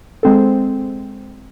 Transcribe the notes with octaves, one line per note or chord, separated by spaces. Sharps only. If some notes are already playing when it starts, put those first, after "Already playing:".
G#3 C4 A4